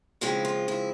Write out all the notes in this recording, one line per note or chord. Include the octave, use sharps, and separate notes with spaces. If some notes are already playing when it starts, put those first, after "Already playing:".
C#3 F3 G#3 C4 E4
F4
E4